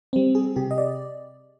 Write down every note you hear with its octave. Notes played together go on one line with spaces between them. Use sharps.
G3 C4
G#4
C3 G4
D#5
D5